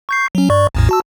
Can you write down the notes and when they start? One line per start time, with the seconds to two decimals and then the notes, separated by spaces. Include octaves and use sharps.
0.09 C#6 G6 C7
0.35 F#3 C#4
0.50 G2 D5 C#6
0.75 A1 E2 A2
0.89 F#4 A5 E6